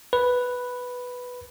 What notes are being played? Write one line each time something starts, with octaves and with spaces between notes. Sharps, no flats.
B4